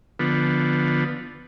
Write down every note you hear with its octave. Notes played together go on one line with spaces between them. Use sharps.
D3 F3 B3